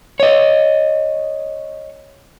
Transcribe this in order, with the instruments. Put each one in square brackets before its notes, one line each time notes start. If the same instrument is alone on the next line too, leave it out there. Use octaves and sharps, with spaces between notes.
[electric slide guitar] C#5 D#5